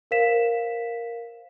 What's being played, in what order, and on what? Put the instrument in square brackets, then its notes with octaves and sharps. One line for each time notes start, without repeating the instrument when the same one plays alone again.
[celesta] A#4 C5 F5 B6 E7